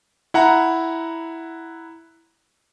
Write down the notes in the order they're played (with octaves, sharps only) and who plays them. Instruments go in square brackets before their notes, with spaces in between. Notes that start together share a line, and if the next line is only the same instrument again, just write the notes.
[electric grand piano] E4 F#5 A#5